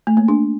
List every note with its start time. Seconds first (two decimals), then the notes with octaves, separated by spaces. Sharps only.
0.07 A3
0.17 A#3
0.28 D4